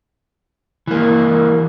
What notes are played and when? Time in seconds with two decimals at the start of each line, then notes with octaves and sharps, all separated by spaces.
0.87 E3 A#3